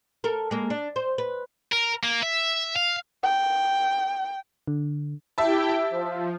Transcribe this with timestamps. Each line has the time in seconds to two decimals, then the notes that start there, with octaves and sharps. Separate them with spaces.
0.24 A4 A#4
0.51 G#3 A#3
0.70 D4
0.96 C5
1.18 B4
1.72 A#4
2.03 A#3
2.23 E5
2.76 F5
3.24 G5
4.67 D3
5.38 E4 G4 E5 G5 A5
5.90 F3